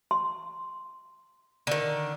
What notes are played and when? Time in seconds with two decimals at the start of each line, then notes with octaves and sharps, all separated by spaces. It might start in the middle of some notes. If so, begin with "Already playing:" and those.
0.11 C6
1.67 D3 D#3